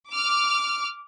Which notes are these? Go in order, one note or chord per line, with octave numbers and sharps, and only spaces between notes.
D6 F6